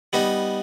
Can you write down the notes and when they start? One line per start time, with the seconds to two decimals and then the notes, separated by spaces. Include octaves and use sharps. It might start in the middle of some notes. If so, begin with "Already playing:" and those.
0.13 G3 B3 D#4